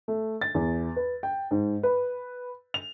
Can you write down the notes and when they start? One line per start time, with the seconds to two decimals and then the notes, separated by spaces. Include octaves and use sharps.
0.08 A3
0.41 A6
0.55 E2
0.96 B4
1.23 G5
1.51 G#2
1.83 B4
2.74 F7